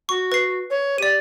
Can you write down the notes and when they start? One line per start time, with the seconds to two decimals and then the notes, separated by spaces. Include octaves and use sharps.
0.09 F#4 C#6
0.32 B4 C7
0.70 C#5
0.98 G4 D5 D#7